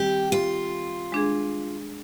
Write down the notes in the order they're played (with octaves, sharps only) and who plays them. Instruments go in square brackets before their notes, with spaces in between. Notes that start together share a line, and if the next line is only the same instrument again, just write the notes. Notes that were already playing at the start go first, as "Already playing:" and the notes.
Already playing: [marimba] D#3 G3 C4 [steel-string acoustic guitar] G4
[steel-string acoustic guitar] F4
[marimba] G#3 D4 G#4